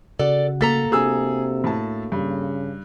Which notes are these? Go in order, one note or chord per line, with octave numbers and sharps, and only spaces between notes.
C#3 F#4 A4 D5 F#5
A#3 A4 A#5 A6 B6
C3 D4 F#4 G#4 E6
A2 A5
G2 C#3